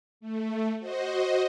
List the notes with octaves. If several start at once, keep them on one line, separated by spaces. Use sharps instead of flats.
A3
F#4 C5 D#5